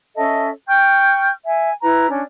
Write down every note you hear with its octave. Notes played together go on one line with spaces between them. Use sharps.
C#4 A4 D#5 E5
G5 C#6 F6 G6
E5 G#5
E4 B4 A#5
C#4 D4